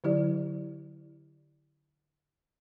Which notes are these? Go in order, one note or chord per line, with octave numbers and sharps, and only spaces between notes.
D3 F#3 E4 G4 D5